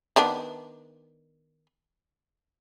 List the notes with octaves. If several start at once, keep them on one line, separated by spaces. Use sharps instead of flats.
D#3 B3 D4